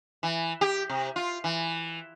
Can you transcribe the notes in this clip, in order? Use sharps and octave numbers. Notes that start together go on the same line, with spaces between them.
E3
G4
C3
F4
E3